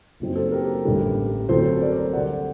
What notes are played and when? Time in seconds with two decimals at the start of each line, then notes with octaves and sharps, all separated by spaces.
0.20 F#1 F#2 F#3 C4 D#4
0.35 A4 C5
0.52 G4 A#4
0.85 A1 G2 D3 G3 D4
1.48 D2 D3 F#3 A3 C4 A4 C5
1.81 A#4 D5
2.13 D2 D3 G3 D5 F#5